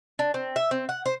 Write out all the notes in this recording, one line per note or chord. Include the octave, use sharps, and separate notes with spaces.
D4
C4
E5
C4
F#5
C5